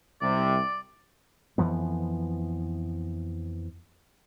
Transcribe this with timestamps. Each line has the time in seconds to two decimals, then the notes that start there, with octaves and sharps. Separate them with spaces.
0.21 C2 C3 D5
1.58 F2 E3 F3 B3